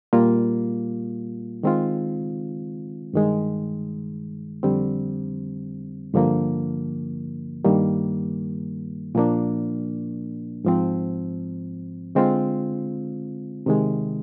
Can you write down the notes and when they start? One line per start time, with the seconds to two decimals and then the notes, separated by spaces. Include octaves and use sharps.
0.13 A#2 G3 A#3 F4
1.63 D#3 G#3 C4 F4
3.13 G2 D#3 G#3
4.63 F2 D3 G3 C4
6.14 G2 D3 F3 A#3
7.64 G2 D#3 G3 A#3
9.15 A#2 F3 A#3 D4
10.64 G#2 F3 C4
12.15 D3 G#3 C4 F4
13.66 C3 D#3 G#3